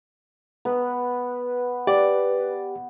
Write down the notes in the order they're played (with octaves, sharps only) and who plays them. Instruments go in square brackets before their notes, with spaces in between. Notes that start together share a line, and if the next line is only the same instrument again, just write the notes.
[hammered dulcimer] B3 [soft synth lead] B4
[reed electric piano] G4 [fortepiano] D5